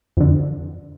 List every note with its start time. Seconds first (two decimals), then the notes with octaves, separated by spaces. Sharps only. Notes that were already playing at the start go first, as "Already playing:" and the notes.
0.17 F2 D3